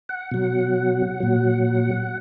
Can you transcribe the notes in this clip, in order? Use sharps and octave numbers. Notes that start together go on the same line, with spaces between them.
F#5
B2 F#3
A#2 F#3